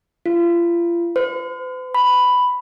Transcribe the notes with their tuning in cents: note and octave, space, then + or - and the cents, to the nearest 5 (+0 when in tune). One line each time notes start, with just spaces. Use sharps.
F4 -35
C5 -45
B5 +5